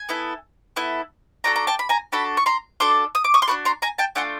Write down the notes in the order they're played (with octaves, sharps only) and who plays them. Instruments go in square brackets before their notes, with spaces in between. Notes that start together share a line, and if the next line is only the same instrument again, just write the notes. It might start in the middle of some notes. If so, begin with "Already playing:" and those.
Already playing: [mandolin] G#5
B3 E4 A4
B3 E4 A4
D4 F#4 A4 G#5 A#5
A#5
G5 A5
B5
G#5 A#5
D4 F#4 A4 A5 B5
C#6
A#5 C6
D4 F#4 A4 C6 D6
D#6
D6
C#6 D#6
C6
D4 F#4 A4 B5 C#6
A#5 C6
G#5 A#5
G5 A5
A3 D4 F4 F#5 G#5